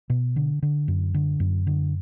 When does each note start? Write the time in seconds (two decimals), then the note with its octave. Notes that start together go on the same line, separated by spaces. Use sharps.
0.10 B2
0.36 D3
0.63 D3
0.88 F#2
1.14 D3
1.40 F#2
1.67 D3